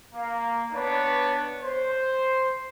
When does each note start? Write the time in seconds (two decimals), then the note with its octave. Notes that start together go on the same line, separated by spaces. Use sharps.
0.14 A#3
0.72 B3 D4 B4 C#5
1.61 C5